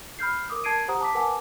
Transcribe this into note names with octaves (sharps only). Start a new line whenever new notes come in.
B5 F6 G6 C7
A#4 D6 D#6
A#4 A5 G#6 C7 D7 D#7
G4 C5 F#5 A#5 D#6
A5 D6 B6
A#4 B4 F#5 G#5 A5 D6